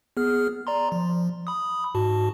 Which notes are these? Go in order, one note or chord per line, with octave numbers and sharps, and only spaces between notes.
B3 G#4 F6
D5 A#5 C6
F3
B5 D#6
G#2 F#4 A5